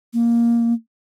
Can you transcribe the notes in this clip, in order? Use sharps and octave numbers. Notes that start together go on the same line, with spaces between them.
A#3